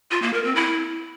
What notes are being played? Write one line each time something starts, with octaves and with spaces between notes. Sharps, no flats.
F4
A#3
A#4
C4
E4